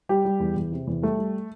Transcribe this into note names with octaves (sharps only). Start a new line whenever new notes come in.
G3 G4
G3
E2
E2
C3
E2
G3 A3
G3